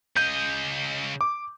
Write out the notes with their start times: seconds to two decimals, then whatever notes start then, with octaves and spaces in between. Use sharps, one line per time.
0.17 C#3 D#5 G6
1.21 D6